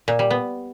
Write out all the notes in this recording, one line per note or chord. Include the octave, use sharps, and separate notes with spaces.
A#2
G3
B3